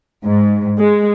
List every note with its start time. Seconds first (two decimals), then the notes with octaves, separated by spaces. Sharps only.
0.24 G#2
0.78 G#3